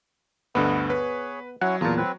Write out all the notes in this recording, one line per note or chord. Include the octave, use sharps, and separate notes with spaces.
D2 G2 D3 B3 B4 D#5 F#5
G#4 B4 C#5
F#3 C#4 E4 C#5 F#5
E2 A#2 F4 A5 A#5
C4 B4